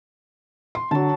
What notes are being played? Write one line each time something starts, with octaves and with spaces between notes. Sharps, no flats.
C6
D3 F#3 A5